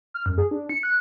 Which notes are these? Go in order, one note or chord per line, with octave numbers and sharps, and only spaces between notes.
F6
F#2
G#4
D4
C#7
F#6